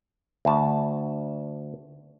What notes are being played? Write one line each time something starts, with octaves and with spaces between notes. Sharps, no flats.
D2 A5